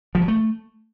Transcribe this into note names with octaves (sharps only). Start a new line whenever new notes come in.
F3
F#3
A3